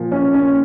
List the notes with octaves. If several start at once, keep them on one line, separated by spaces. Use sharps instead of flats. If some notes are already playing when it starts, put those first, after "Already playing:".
Already playing: A#2 F3
C#4
C#4